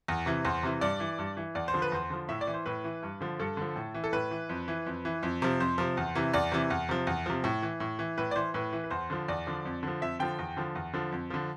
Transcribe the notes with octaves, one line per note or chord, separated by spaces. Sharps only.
E2
C3 E3
E2 C5
C3 E3
G2 D5
E3
G2
E3
E2 D5
C5
D3 F3
B4
E2 C5
D3 F3
A2 E5
D5
E3
C5
A2 B4
E3
G2
D3 F3
G2 A4
D3 F3
A2
E3
A4
A2 B4
E3
F2
E3
F2
E3
F2
C3 F3
F2 C5
C3 F3
E2
C3 E3
E2 D5
C3 E3
E2
C3 F3
E2
C3 F3
A2
E3
A2
E3
A2 B4
D5
E3 C5
A2 B4
E3
B4
E2 C5
D3 F3
E2 D5
D3 F3
F2
D3 F3
F2 E5
D3 F3 G5
E2
D3 F3
E2
D3 F3
F2
D3 F3